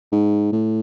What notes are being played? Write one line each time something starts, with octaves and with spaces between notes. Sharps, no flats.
G#2
A2